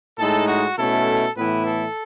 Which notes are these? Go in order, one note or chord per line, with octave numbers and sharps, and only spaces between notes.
A2 G#3 D#4 A4
F#4
B2 A3 C#4 E4 A4
A2 E3 B3 E4 B4
A4